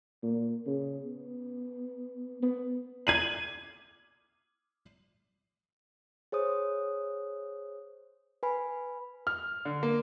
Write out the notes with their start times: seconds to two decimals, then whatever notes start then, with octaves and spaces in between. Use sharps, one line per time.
0.23 A#2
0.67 C#3
1.05 B3
2.42 B3
3.07 G#6 D#7 F#7
6.32 G#4 C5 C#5 D#6
8.43 B4 G#5 B5
9.27 F6
9.65 D3
9.83 A#3